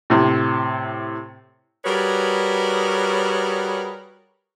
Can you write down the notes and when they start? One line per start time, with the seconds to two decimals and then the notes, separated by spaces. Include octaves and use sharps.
0.10 A2 C3
1.85 G3 F#4 G#4 A#4 B4 C#5